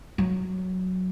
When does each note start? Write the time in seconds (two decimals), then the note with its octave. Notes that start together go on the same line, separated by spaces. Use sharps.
0.18 F#3